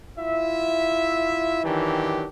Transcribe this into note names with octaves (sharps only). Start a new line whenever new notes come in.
E4 F4 E5
D#3 E3 F#3 D4 G4